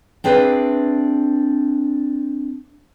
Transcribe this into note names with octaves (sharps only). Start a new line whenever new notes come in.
C4 D4 G#4 B4 E5